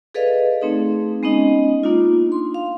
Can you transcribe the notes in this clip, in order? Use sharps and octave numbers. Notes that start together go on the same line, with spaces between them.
G#4 A4 B4 D5 D#5 F5
A3 C4 D#4 G#4
G#3 B3 C#4 D#4 D#5
A#3 D4 D#4 F4
C6
F5